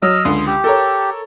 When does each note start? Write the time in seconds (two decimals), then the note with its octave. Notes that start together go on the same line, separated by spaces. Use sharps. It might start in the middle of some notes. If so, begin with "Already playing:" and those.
0.02 F#3 D#5 E6 F6
0.25 C#2 D3 C6 D#6
0.47 G4
0.64 A4 A#4 C#5